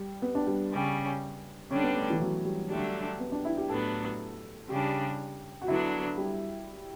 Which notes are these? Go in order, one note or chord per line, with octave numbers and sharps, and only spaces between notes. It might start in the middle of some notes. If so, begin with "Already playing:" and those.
Already playing: G3
B3
D4
G3
C#3 G3 C#4
D3 G3 C#4 D4
B3
A3
E3
F#3
G3
D3 F#3 G3 A3 D4
B3
D4
E4
G4
A2 F#3 B3 D4 A4
C#3 G3 D4 G4
F#4
D3 F#3 B3 D4 E4
G3